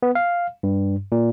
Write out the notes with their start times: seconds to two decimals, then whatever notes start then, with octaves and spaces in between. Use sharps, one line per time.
0.03 B3
0.15 F5
0.63 G2
1.12 A#2